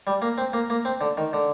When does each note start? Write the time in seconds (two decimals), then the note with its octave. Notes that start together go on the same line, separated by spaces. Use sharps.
0.07 G3
0.22 A#3
0.38 C4
0.53 A#3
0.70 A#3
0.85 C4
1.01 D3
1.18 D#3
1.33 D3